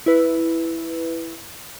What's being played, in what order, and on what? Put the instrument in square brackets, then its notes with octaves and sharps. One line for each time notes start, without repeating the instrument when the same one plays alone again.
[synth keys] E4 B4